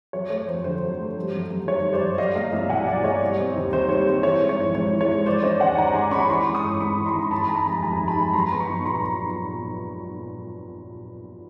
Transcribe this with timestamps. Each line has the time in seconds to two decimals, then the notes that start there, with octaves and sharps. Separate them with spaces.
0.13 F#3 C#5
0.30 A3 C#5
0.47 F2 C5
0.64 D3 C5
0.82 F#3
0.99 A3
1.16 G3
1.33 F#2
1.50 F#2
1.67 D#3 C#5
1.85 G3
1.93 C5 D5
2.02 F#2
2.18 F#3 D#5 F5
2.35 A#3 D#5 F5
2.52 C2 D5 E5
2.69 B2 F#5 G#5
2.87 F#3 D5 E5
3.04 A#3 C#5 D#5
3.22 G3
3.38 C4
3.56 D#2
3.73 D#3 C5
3.89 G3 C#5
4.07 C4 C5
4.23 E3 C#5
4.40 G#3
4.49 C#5
4.58 A#1
4.75 G#2 C#5
4.93 E3
5.01 C#5
5.10 G#3
5.26 G#3 C5 D5
5.43 C#4 C#5 D#5
5.60 D#2 F#5 G#5
5.78 D#3 G#5 A#5
5.94 G#3 C6 D6
6.11 C#4 B5 C#6
6.29 E3 C6 D6
6.45 G#1
6.55 C#6 D#6
6.63 G#1
6.80 G#2 B5 C#6
6.97 E3
7.06 A#5 C6
7.14 G#1
7.31 D#3 A5 B5
7.49 G#3 G#5 A#5
7.66 F1 A5 B5
7.82 D#2 G#5 A#5
7.99 D#3
8.08 A5 B5
8.16 G#3
8.34 F#3 A#5 C6
8.52 B3
8.60 B5 C#6
8.69 B1
8.85 A#2 A#5 C6